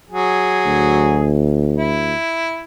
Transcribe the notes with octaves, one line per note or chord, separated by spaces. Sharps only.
F#3 G#4
D2
E4